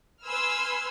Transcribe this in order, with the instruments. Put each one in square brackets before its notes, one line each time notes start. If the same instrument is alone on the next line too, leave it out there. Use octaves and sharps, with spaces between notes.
[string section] B4 G#5 C6 E6 F6